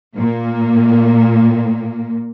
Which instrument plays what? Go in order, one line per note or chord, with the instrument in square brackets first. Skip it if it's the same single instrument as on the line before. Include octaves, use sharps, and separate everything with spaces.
[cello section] A#2 A#3